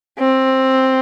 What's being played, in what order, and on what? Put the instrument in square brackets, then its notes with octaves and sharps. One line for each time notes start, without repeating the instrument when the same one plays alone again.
[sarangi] C4